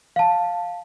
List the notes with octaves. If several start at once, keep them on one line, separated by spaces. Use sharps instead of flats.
F5 A5